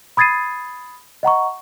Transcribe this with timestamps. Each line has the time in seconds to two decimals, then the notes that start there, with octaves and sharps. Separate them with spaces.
0.17 B5 D#6 G#6 A6 C7 D#7
1.23 D#5 F#5 A#5 C#6